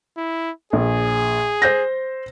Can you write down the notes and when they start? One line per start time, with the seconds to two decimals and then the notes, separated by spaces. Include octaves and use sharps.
0.17 E4
0.73 A#1 G#4
1.62 C5 G6 A#6